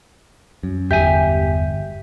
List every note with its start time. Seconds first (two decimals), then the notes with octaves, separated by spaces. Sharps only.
0.63 F#2
0.91 G1 E2 G4 E5 G#5 G6